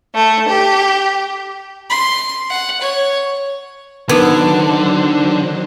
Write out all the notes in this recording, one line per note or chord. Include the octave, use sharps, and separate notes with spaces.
A3
G4
C6
F#5
C#5
D3 D#3 F#3 B3 D#4 C5 D6 G#6